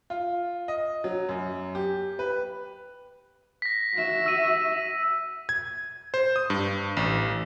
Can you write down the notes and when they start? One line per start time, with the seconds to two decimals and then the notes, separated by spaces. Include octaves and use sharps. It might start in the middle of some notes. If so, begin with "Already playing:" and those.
0.10 F4
0.68 D#5
1.04 F#3
1.29 F#2
1.75 G4
2.19 B4
3.62 A#6 B6
3.94 F#4 E5
4.26 E6 D#7
5.49 G#6
6.14 C5
6.36 D#6
6.50 G2
6.97 A1